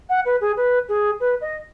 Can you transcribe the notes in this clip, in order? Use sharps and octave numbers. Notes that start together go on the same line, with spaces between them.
F#5
B4
G#4
B4
G#4
B4
D#5